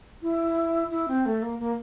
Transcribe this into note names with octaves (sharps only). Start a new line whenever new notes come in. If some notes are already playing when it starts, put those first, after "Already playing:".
E4
E4
C4
A3
A#3
A#3